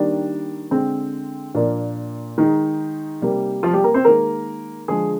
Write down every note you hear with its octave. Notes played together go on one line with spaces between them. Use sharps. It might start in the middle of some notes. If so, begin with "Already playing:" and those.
Already playing: D#3 G3 A#3 D4
D3 G#3 C4
A#2 F3 A#3 D4
D#3 G#3 D#4
C3 G3 A#3
F3 F4
G3 G4
A#3 A#4
C4 C5
D#3 G#3 A#3 A#4
D3 F3 G#3 G#4